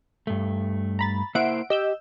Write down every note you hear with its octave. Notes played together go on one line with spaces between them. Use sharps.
G2 A3
A#5 B5 A6
A#3 E4 C5 E5 F#5 D7
G4 D#5 E6 G6